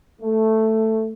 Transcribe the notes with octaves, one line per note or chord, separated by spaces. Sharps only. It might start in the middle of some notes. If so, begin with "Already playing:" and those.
A3